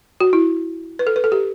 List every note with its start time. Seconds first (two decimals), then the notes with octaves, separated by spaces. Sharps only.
0.20 F#4
0.33 E4
0.99 B4
1.07 A4
1.16 B4
1.24 A4
1.32 G4